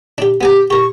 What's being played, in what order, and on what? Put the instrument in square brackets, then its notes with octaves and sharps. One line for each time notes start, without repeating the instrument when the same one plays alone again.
[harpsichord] D4 G4
[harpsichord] B3 G#5 A#5 [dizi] G4
[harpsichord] G4 A#4 [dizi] C#6